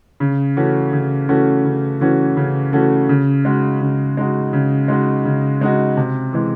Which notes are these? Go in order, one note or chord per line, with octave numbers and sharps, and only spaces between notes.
C#3
E3 A3 C#4 F#4
C#3
E3 A3 C#4 F#4
C#3
E3 A3 C#4 F#4
C#3
E3 A3 C#4 F#4
C#3
G#3 D#4 F#4
C#3
G#3 D#4 F#4
C#3
G#3 D#4 F#4
C#3
G#3 D#4 F#4
C3
E3 G#3